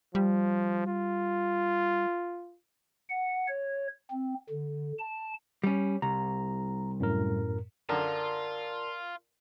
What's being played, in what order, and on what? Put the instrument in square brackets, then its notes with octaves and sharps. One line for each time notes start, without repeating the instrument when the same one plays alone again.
[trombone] F3 [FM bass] G3
[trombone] F4
[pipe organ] F#5
C#5
C4
D3
A5
[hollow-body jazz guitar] G3 C#4
[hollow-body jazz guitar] C2 [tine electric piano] A#5
[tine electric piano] F#2 A2 A#4
[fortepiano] F#2 D3 [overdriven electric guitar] F4 [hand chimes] A#4 D5 A5